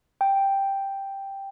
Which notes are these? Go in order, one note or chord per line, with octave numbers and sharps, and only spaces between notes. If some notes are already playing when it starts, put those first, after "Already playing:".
G5